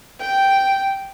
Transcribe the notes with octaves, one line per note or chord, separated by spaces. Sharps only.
G5